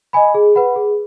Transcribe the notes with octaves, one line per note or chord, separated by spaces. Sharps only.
D#5 G#5 B5
G#4
B4 F#5 B5
G#4